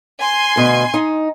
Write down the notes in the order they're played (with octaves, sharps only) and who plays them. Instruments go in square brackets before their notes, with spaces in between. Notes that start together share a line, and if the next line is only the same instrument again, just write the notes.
[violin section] G#5 C6
[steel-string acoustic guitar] D2 B2
D#4